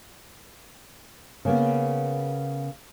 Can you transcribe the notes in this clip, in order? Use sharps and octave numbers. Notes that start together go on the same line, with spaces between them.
C#3 A#3 B3